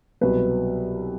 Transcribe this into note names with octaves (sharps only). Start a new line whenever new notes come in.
C2 B2 F#3 B4